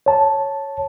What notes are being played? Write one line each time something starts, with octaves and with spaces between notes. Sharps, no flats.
C#5 A5